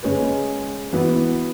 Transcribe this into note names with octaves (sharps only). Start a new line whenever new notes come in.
C#3 G#3 C#4 G#4 B4
E3 B3 F#4 B4